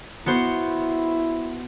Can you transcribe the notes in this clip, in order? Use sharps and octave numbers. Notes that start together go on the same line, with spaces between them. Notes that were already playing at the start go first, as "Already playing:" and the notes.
B3 E4 F#4 C5